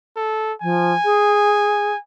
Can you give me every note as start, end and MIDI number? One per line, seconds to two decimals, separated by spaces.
0.16 0.53 69
0.62 0.93 53
0.62 1.99 80
1.05 1.92 68